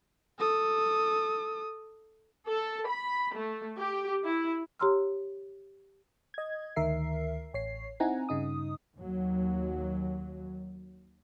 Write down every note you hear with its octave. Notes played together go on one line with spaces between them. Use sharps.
A4 D#6
A4
B5
A3
G4
E4
G4 C#5 A#5 C6 E6 F6
D#5 G#6
D2 D#3 A#4 E5 C7
A1 C#5 C7
C4 D#4 E4 F#5 G#5 A#5
G2 C#3 D#4 D#6
D#2 F#3